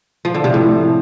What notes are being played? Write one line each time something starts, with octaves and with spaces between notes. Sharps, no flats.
F3
D3
C3
A2